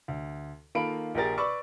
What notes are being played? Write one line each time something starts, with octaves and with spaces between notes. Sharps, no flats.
D2
D#3 A#3 F4 A4 B5 D7
A#1 G4 G#4 A#4 A6
B4 D5 B5 C#6 D6 E6